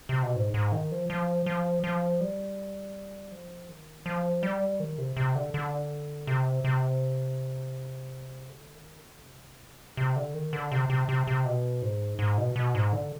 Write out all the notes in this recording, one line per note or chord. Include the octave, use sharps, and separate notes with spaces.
C3
B2
G#2
G#2
D#3
F3
F3
F3
F3
G3
F3
D#3
F3
G3
D#3
C3
C3
D3
D3
C3
C3
D3
D#3
D3
C3
C3
D3
D#3
D3
C3
C3
C3
C3
B2
G#2
G#2
B2
B2
G#2
D3